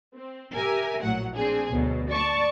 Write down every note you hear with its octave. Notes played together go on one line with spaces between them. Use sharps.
C4
G4 A#4 E5 G#5
A#1 A2 F#3 F#5
C4 D4 G#4
D2 B2 F#3
D5 A5 C#6